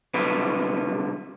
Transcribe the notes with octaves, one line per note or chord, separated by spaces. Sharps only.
C2 B2 D3 F#3 B4